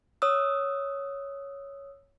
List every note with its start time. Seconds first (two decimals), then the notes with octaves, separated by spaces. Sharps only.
0.22 C#5 D#6 E6